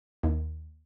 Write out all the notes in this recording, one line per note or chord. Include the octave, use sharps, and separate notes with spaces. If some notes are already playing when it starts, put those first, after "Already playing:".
D#2